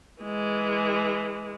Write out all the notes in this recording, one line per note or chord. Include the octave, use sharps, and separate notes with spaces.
E3 G#3